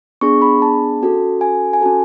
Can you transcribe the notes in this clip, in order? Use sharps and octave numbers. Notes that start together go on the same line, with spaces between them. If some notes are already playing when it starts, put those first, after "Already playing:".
B3 D4 G#4 C#6
B5
A5
C#4 F#4 A4
G#5
G#5
C#4 F#4 A4 A5